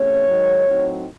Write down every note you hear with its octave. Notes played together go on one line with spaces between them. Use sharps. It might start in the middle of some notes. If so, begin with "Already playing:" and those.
Already playing: E2 C3 A3 C#4 C#5
G#2 D#3 F#3
A2 F#3 C4 D#4